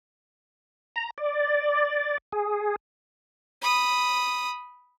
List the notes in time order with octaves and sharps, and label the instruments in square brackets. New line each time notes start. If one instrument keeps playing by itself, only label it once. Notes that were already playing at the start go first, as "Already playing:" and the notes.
[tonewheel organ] A#5
D5
G#4
[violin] B5 D#6